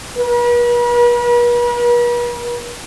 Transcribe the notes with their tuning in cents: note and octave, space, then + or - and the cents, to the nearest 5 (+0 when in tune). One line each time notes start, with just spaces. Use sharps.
B4 -45